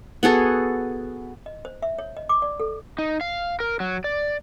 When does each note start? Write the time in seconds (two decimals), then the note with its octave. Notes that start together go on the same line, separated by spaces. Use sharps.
0.23 B3 F#4 G#4 A4
1.46 D#5
1.65 C5
1.82 E5
1.99 C#5
2.17 D#5
2.29 D6
2.42 D5
2.60 A4
2.98 D#4
3.21 F5
3.60 A#4
3.80 F#3
4.04 D5